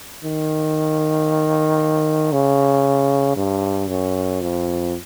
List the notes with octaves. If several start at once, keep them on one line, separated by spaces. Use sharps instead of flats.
D#3
C#3
G2
F#2
F2